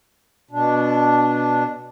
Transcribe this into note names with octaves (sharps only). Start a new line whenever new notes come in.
B2 D4